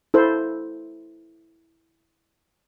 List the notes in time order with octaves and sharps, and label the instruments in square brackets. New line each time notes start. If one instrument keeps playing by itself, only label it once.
[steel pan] E4 A4 C5